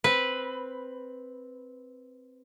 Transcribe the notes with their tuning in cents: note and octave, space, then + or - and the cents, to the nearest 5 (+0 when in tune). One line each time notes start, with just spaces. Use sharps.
C4 +0 B4 +0